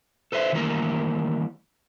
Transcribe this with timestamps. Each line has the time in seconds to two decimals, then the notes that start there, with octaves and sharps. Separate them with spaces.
0.32 A4 B4 C5 E5
0.52 D#3 E3 G3 A3 A#3 A#4